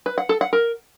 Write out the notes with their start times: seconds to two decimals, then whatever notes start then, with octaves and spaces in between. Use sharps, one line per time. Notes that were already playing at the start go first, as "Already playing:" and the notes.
0.06 B4
0.18 F#5
0.29 A4
0.41 F#5
0.53 A#4